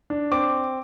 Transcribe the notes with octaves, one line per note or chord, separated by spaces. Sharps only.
D4
C4 D6